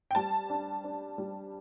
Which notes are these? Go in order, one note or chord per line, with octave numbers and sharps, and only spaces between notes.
G5
G3 A5
D4
D4
G3